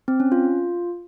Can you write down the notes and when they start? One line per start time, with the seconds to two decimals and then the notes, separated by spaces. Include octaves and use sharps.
0.08 C4
0.20 C#4
0.32 F4